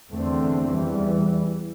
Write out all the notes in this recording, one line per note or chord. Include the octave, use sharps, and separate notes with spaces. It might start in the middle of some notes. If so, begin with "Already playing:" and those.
E2 D3 A3 C4
E2 E3 G3